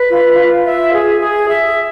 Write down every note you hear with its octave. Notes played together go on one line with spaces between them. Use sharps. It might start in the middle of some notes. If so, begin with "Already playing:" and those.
Already playing: B4
F4
F4
E5
G#4
G#4
E5